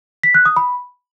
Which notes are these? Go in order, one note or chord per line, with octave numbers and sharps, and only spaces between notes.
B6
F#6
D#6
B5